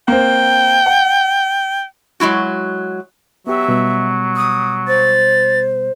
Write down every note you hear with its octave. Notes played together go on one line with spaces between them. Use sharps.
A#3 C4 G5
F#5
F#3 G#3 E4 F#4
F#3 B3 G4 E5
B2 G3 B3
D#6
C5 A6